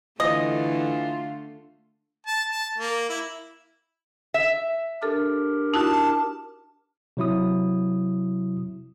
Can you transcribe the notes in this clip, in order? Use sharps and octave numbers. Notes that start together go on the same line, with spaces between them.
D3 E3 A3 F4 D#5
A5
A5
A#3
E4
E5
D4 G4 A4 A#4
D#4 E4 F#4 A5
C3 F#3 E4 D#6